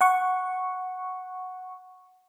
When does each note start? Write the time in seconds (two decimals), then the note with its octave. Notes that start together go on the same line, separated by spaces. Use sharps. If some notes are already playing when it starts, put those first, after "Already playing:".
0.01 F#5 C#6